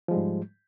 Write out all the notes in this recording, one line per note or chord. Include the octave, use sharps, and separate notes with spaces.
G#2 F3 G3 G#3